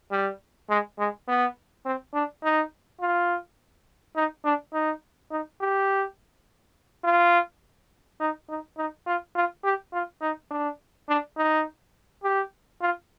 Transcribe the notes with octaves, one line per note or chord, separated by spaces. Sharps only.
G3
G#3
G#3
B3
C4
D4
D#4
F4
D#4
D4
D#4
D#4
G4
F4
D#4
D#4
D#4
F4
F4
G4
F4
D#4
D4
D4
D#4
G4
F4